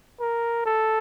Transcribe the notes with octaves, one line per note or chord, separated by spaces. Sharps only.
A#4
A4